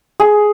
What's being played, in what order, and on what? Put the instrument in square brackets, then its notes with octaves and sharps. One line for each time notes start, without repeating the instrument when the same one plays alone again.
[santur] G#4